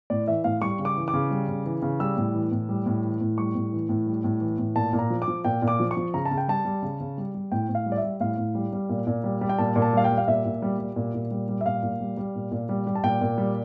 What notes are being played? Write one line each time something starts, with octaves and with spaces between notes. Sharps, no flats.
A2 D5
E3 E5
A2 F5
G3 C#6
C#3
D6
E3
D6
C#3
G3
C#3
E3
C#3
G3 E6
A2
E3
A2
G3
A2
E3
A2
G3 C#6
A2
E3
A2
G3
A2
E3
A2
A#2 A5
A#2
A#5
F3
D6
F3
A#2 G5
A#2
D6
F3
C#6
F3
C#3 A#5
A5
C#3
G5
G3 A5
G3
C#3
C#3
G3
G3
A2 G5
A2
F5
G3
D5
E5
G3
A2 F5
A2
G3
G3
A#2
A#2
G3
G3
G5
A#2 A5
A#2
A5
G3 F5
G5
G3
F5
A#2 E5
A#2
G3
G3
A#2
A#2
G3
G3
E5
A#2 F5
A#2
G3
G3
A#2
A#2
G3
G3
A5
A#2 G5
A#2
G3